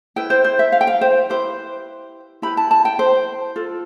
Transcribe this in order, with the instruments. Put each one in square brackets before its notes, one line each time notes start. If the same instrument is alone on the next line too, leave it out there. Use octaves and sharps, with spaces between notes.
[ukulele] E4 B4 G5
C5
C5
E5
F5
G5
F5
C5
E4 G4 B4 C5
E4 G4 B4 B5
A5
A5
G5
C5
F4 A4